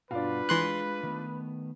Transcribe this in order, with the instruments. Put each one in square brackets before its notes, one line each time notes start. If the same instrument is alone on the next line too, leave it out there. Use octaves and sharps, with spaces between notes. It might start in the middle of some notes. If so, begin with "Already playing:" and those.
[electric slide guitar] G2 B2 F#4 [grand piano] D4 F4 F5 [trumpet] B4
[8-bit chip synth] E3 C6 F#6 [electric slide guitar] G#3
[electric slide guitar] D#3 A3 B3